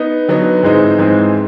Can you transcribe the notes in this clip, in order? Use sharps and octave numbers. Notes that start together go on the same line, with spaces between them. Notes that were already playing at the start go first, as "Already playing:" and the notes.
Already playing: B3 D#4
D3 F#3 B3 D#4
G#2 E3 G#3 C4 D#4
G#2 E3 G#3 C4 D#4